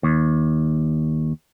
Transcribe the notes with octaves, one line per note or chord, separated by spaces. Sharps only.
D#2